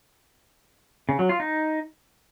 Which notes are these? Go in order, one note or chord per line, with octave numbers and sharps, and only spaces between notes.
C#3
F#3
F4
D#4